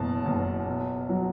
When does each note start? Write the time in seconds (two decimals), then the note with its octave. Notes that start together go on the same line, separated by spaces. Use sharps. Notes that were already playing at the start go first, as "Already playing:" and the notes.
Already playing: F#1 E2 B2 A5
0.25 F#1
0.67 B2
1.09 F#3